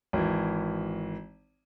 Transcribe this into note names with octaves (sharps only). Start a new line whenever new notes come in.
G#1 E3